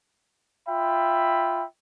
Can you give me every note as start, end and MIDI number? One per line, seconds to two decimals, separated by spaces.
0.69 1.64 65
0.69 1.64 76
0.69 1.64 79
0.69 1.64 83